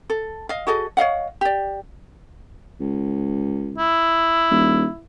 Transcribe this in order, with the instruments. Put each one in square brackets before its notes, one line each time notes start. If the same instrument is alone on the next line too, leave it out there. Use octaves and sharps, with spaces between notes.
[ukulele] A4
D#5 F5
F#4 G#4 A4 D#5
C#5 D#5 F5 F#5
G4 D5
[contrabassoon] C#2
[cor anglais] E4
[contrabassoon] D#1